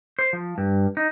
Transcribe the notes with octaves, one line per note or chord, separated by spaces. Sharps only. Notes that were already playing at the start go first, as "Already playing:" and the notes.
C5
F3
G2
D#4